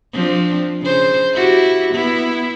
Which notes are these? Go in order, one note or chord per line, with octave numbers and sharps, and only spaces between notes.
F3 C4 D4
C#3 C5
E4 F#4 G4
B3 E4